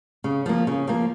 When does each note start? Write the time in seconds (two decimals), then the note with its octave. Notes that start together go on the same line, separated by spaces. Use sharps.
0.24 C#3
0.46 F3 A#3
0.67 C#3
0.88 F3 A#3